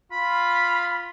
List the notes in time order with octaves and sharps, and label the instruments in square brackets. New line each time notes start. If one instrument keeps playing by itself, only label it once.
[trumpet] F4 [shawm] B5